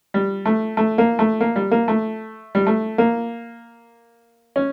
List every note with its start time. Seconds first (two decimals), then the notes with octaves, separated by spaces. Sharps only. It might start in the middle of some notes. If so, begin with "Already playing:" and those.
0.14 G3
0.46 A3
0.77 A3
0.98 A#3
1.19 A3
1.41 A#3
1.56 G3
1.71 A#3
1.88 A3
2.55 G3
2.67 A3
2.98 A#3
4.56 C#4